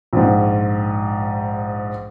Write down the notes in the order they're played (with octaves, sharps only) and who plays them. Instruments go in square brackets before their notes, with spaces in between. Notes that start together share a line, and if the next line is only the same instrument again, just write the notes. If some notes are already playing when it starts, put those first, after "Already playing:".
[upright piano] A#1 G#2